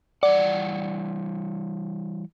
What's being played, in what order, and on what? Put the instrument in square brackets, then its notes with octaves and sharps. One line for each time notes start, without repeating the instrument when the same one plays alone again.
[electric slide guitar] E3 G3 F#5 [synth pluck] D5